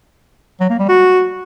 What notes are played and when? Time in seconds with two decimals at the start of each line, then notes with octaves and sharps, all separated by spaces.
0.60 F#3
0.70 A#3
0.79 G3
0.89 F#4